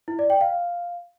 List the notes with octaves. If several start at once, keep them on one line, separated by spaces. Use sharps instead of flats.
E4
D5
G5
F5